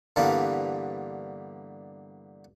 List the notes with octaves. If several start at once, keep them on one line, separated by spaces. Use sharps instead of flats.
G2 D3 E3 G3 A#3 B3